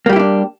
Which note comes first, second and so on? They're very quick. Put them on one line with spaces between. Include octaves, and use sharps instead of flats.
A#3 G3 G4 E4 D4